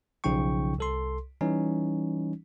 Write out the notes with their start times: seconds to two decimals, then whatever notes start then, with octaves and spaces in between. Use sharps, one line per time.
0.24 B1 C#3 F3 D#4 G5 C#6
0.78 C2 A4 C6
1.41 E3 G3 C#4 D#4